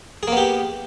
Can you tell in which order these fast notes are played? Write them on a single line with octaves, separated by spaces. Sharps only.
G#4 A#3 B3 G4